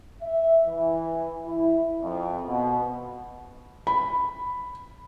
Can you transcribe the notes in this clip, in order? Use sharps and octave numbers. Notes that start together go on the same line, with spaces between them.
E5
E3
E4
F2
B2
B5